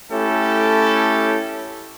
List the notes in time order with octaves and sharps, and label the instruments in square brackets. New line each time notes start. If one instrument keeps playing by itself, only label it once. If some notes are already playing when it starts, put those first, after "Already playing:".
[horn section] A3 C#4 E4 G4 A4